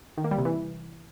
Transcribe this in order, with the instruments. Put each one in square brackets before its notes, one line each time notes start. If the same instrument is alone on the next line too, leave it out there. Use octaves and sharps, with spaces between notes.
[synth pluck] D#3
A#3
G3
C3
E3